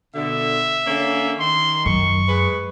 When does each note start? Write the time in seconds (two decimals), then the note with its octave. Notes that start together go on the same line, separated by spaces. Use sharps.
0.15 B2 D3 E5
0.87 D3 A#3 C#4
1.40 D#3 C6
1.86 F#2 C#6
2.28 G#3 B4